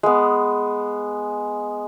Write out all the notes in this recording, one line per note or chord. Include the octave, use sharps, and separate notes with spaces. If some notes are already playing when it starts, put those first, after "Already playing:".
G#3 B3